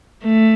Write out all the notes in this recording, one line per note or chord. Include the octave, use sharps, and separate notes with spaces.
A3